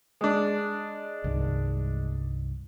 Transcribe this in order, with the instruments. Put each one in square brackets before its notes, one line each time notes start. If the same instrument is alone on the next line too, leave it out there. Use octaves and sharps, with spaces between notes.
[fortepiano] G#3 D4
[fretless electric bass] C2 G2 D#3